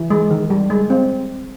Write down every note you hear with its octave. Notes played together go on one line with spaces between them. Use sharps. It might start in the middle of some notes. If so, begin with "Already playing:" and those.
Already playing: E3
G#3
D#3
G3
G#3
C4